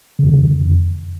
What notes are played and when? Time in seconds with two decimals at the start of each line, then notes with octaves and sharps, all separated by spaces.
0.19 C#3
0.24 E2
0.29 D3
0.34 F2